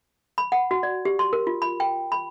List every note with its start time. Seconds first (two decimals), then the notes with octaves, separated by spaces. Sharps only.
0.38 B5
0.52 F#5
0.71 F#4
0.83 D5
1.05 G4
1.19 C6
1.33 A#4
1.47 F4
1.62 B5
1.80 G5
2.12 B5